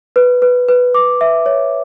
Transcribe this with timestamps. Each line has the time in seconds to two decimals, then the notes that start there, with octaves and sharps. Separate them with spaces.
0.16 B4
0.42 B4
0.68 B4
0.94 D6
1.21 E5
1.46 C#5